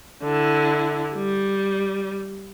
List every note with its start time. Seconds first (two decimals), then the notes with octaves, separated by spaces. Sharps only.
0.23 D3 E4
1.15 G3